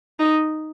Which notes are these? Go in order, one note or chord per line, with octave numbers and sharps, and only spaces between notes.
D#4